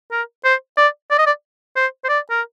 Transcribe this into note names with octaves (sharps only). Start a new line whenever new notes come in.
A#4
C5
D5
D5
D#5
D5
C5
C5
D5
A#4